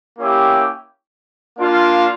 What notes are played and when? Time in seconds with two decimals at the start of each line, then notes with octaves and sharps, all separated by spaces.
0.18 A#3 C#4 E4 G4
1.59 A#3 D4 F4